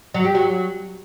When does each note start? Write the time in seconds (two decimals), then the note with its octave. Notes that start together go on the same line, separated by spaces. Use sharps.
0.14 F#3
0.25 G4
0.35 F#3